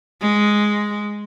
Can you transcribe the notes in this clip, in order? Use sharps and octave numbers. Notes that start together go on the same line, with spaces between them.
G#3